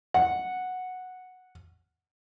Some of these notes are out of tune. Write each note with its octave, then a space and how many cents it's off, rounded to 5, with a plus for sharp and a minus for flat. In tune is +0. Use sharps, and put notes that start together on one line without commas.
F#5 -5